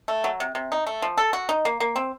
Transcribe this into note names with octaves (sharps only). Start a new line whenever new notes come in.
A3
F#3
C3
C3
D#4
A3
F3
A4
F#4
D#4
A#3
A#3
C4